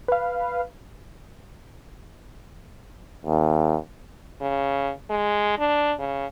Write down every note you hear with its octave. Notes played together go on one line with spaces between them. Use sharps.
B4 F5
D#2
C#3
G#3
D4
C#3